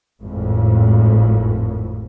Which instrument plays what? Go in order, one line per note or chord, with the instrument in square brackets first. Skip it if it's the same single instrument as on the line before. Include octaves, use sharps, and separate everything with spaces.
[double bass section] G#1 F2 A2